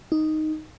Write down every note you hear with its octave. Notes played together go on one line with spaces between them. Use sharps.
D#4